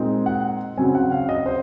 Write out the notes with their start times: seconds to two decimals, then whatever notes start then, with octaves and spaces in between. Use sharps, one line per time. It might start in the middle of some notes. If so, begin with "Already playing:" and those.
Already playing: A#2 G#3 C4 D#4
0.26 F#5
0.77 C#3 F#3 C4 G#5
0.95 F#5
1.12 F5
1.29 D#5
1.46 C5